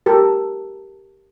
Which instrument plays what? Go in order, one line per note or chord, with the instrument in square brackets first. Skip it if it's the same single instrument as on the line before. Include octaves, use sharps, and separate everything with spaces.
[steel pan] G4 A4 A#4